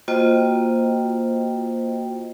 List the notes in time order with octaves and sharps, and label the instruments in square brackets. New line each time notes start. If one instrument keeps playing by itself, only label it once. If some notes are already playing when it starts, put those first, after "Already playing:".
[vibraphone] A#3 F4 F#4 C5 D#5 G5